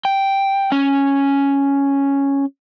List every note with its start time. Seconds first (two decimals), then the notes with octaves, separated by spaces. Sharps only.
0.05 G5
0.72 C#4